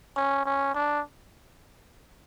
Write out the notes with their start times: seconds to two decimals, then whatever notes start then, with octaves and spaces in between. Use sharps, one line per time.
0.17 C#4
0.45 C#4
0.74 D4